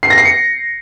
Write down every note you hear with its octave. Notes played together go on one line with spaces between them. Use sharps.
C7
A#6
C7
C#7